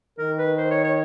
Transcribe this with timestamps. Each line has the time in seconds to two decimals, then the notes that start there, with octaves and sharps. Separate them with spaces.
0.18 D#3 A#4
0.38 B4
0.58 C5
0.71 C#5
0.84 C#5